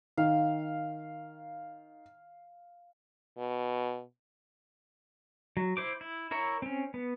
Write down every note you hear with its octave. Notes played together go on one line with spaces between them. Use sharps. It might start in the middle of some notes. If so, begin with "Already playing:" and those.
D#3 F5
B2
F#3
E4 C5 D6
E4
E4 A#4 C#5 E5
C4 C#4
B3